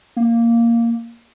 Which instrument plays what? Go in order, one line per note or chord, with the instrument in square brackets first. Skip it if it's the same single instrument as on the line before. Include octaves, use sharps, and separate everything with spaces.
[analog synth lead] A#3